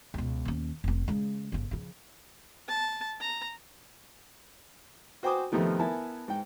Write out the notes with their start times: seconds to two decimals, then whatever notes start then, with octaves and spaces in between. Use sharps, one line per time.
0.14 C#2 B2
0.45 D#2 C#4
0.84 F1 C4
1.08 C#3 G#3
1.52 G1 C#3
1.71 C#3 F3
2.68 A5
3.21 A#5
5.23 F#4 C5 G5 G#5 D6 D#6
5.52 F2 C3 D#3 F3 A3 B3
5.79 B3 E4 A#4 G#5 A5
6.28 G#2 G5